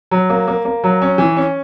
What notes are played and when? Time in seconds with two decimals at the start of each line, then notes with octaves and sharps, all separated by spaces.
0.11 F#3
0.30 A#3
0.48 A#3
0.65 A#3
0.84 F#3
1.02 C#4
1.18 E3
1.37 C#4